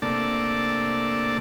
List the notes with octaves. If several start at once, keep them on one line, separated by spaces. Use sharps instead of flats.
C3 A3 A#3 D4 D5 A5